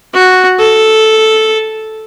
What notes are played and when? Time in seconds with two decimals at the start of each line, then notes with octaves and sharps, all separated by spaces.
0.13 F#4
0.60 A4